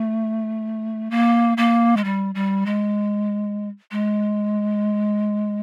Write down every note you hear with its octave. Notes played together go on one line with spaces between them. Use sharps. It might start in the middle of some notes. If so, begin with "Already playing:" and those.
Already playing: A3
A#3
A#3
G#3
G3
G3
G#3
G#3